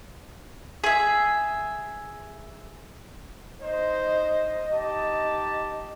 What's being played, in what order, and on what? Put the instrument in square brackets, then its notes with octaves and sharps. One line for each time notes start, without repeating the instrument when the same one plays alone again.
[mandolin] G#4 E5
[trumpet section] D#4 C5 [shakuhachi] D#5
[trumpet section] D#4 G4 A5